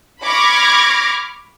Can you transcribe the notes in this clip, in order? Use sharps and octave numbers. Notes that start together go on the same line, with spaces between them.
B5 C#6 D6 F6 G#6 A#6